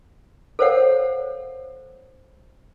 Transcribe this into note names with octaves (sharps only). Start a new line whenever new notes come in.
A4 A#4 C5 C#5 F5 F#5